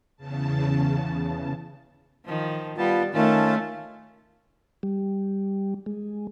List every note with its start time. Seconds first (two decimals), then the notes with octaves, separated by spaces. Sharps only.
0.17 E2 C#3 A5
2.25 D#3 F3
2.78 G3 B3 F4 A5
3.14 D#3 A3 C#4 F4 A5
4.83 G3
5.86 G#3